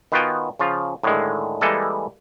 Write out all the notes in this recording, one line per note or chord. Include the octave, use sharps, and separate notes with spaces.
D#3 B3 F4 F#4 G5 G#5
C#3 F3 F4
A2 D3 D#3 G#3
E3 G3 G#3 A#3 A4 D#5